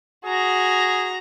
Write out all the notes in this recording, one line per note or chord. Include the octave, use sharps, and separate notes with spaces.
F#4 G#4 A#5